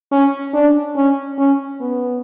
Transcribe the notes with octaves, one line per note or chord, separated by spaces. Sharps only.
C#4
D4
C#4
C#4
B3